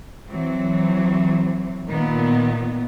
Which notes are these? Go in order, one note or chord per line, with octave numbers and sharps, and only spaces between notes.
E3 F#3 C4
A#2 D#3 B3